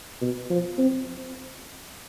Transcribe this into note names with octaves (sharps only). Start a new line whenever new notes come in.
B2
F3
C4